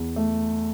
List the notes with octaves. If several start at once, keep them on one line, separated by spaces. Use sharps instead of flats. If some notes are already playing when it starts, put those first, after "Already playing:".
Already playing: E2
A3